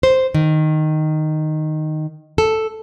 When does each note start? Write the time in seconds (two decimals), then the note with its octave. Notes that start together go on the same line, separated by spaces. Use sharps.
0.03 C5
0.34 D#3
2.38 A4